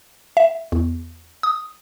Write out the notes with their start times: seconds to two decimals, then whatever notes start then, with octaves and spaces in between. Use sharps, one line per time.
0.37 E5
0.72 E2
1.43 D#6